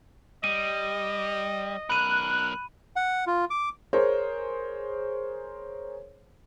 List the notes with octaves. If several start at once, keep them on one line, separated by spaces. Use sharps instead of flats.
G3 D#5 D#7
B1 A#4 B5 F#6 D#7
F#5
F4
D6
G#4 A#4 C5 C#5